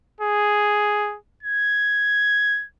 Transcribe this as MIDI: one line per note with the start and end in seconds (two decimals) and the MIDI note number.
0.21 1.17 68
1.43 2.65 92